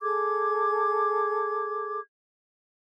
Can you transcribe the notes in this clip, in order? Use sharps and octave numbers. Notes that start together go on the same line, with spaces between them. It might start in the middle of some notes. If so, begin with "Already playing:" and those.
G#4 A4 D6 G#6